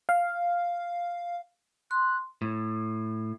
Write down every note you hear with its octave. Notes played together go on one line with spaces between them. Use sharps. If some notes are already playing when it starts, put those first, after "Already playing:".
F5
C6 F#6
A2